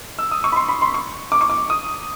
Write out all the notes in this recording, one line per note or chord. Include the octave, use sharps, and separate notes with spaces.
E6
D#6
C#6
B5
C6
B5
C6
C#6
D6
C#6
D6
D#6